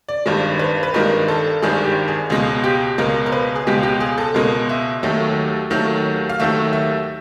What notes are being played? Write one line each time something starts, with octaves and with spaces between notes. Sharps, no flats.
D5
G#1 G2 D#3 G#3
B4
B4
G#1 G2 D#3 G#3 A#4
A4
G#1 G2 D#3 G#3 G#4
G4
G#4
C#2 B2 G#3 G#4
G4
C#2 B2 G#3 A#4
A#4
B4
G#4
C#2 B2 G#3 G4
G4
G#4
A4
C#2 B2 G#3 A#4
E5
D#2 D#3 F#3 A3
D#2 D#3 F#3 A3
F5
D#2 D#3 F#3 A3 E5
E5